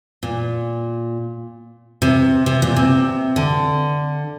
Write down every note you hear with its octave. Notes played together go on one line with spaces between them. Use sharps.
A#2
C3
C3
A#2
C3
D3